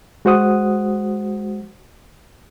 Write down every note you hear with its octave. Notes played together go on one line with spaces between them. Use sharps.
G#3 F#4 C5 F#5 D#6